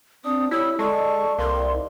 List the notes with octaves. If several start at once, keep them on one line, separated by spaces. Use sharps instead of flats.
C4 D4 D#6
G3 E4 C#5 E6
G#3 A4 D5 C#6
C2 A#3 C6
D#3